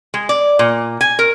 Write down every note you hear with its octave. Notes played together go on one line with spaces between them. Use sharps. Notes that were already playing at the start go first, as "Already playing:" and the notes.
G#3
D5
A#2
G#5
A#4